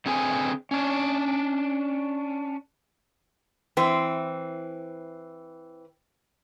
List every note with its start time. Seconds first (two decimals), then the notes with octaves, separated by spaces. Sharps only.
0.06 D3 C4 G#4 B4 G5 G#5
0.71 C#4 D4
3.77 E3 C4